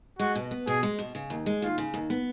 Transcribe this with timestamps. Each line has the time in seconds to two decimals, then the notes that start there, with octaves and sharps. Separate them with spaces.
0.19 G#3 F#4
0.35 B2
0.51 B3
0.67 B2 G#4
0.83 G#3
0.99 B2
1.15 C#3
1.30 D#2
1.46 G#3
1.62 D#2 F4
1.78 C#3
1.94 D#2
2.10 B3